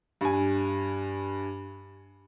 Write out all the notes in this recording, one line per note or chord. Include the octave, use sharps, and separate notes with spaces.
G2 G#5